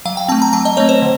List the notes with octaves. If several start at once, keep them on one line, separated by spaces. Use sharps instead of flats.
F#3 F5
G5
A3 C4 A5
A#5
F#3 A5
D#5
A3 C4 C#5
C5
D3